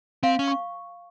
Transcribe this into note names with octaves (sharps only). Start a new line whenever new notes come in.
C4 F5
C#4
C#6